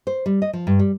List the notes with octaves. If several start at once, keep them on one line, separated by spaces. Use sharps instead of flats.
C5
G3
D#5
F3
G2
G3